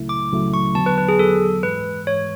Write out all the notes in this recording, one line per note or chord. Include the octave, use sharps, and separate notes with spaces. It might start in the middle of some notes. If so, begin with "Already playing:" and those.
Already playing: C#2 C#3 F#3 A3 E4
D6
C#2 C#3 F#3 A3 E4
C#6
E2 D3 F#3 B3 A5
B4
B4
G#4
E2 D3 F#3 B3 A4
G#2 E3 G#3 B4
G#2 E3 G#3 C#5